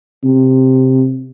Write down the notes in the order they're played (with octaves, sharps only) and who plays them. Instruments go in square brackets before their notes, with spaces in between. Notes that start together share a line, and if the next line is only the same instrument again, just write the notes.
[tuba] C3